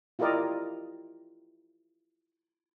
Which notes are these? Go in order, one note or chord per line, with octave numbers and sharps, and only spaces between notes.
E4 F4 G4 A#4 D5 D#5